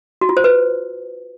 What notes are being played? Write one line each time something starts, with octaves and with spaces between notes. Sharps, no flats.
F#4
F4
C5
B4